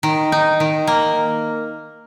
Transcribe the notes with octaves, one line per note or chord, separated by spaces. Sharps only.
D#3
D#4
D#3
A#3